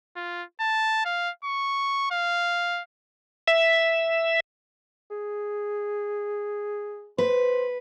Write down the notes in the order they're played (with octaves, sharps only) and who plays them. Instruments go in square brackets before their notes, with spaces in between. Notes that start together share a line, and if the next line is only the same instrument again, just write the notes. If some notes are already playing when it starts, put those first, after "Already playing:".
[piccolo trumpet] F4
A5
F5
C#6
F5
[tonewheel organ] E5
[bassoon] G#4
[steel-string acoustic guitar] B4 [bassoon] C5